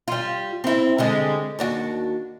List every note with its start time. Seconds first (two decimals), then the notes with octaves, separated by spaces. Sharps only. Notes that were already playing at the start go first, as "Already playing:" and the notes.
0.08 G3 F4
0.64 C4 E4
0.98 D3 G3 G#3
1.59 D#2 D4 F#4